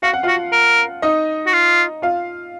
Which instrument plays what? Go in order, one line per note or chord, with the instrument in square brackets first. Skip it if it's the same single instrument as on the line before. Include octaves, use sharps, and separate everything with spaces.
[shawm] F#4 [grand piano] F5
[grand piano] F#5
[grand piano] F4 F5 [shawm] F#4
[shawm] A#4
[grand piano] D#4 D#5
[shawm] F#4
F4
[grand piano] F4 F5